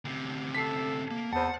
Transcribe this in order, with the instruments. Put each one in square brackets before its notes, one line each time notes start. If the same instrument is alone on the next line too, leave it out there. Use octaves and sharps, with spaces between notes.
[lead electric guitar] D2 C3
[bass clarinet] A4 [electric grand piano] B6 C7
[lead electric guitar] A#3
[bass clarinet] E2 [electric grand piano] C5 A5 [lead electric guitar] F#5